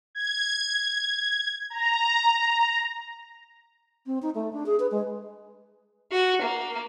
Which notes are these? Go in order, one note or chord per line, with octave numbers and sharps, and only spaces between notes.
G#6
A#5
C4
D#4
A3
D4
G#4
B4
G#3
F#4
A#3